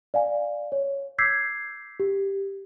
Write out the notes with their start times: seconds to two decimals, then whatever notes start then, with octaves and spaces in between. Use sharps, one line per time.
0.14 D5 F5 G#5
0.72 C#5
1.18 D6 E6 G6 G#6 B6 C7
2.00 G4